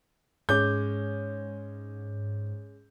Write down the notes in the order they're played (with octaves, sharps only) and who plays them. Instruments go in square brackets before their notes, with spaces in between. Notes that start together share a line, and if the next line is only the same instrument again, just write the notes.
[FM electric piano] G#2 [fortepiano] G#3 C#4 D6 [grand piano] G6